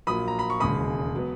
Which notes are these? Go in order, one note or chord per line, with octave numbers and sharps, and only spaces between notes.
A#1 A#2 F#3 A#3 B5 D#6
A#5
B5
C#6
E1 D#2 C#3 G#3 B5 D#6
F#3 B3